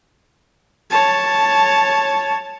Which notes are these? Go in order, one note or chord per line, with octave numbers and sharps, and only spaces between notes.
C#5 A5